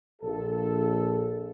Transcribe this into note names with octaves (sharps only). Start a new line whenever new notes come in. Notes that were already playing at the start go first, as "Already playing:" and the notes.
A#1 A4